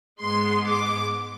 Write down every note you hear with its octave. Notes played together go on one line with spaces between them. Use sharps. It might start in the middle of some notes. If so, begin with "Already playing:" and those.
G#2 G#3 B3 C6
D6